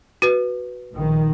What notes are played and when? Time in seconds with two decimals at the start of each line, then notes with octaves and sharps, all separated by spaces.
0.22 F#4 B4
0.93 A#1 D#3